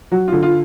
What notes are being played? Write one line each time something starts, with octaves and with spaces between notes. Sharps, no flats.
F#3 F#4
D3 F4
F4